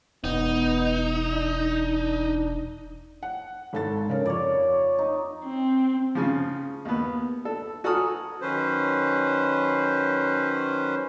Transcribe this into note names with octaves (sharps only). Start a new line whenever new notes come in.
E1 B3 D#4
D4
F#5
G#1 A4 A6
C#3 A#4
F2 C#5 D5
D#4
C4
C#3 F3
D#2 B3
A4
F#4 A4 G#5 A#5 D#6 F6
D#3 F#3 C#4 B4 C5